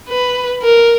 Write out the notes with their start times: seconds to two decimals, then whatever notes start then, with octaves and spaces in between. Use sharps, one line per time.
0.09 B4
0.63 A#4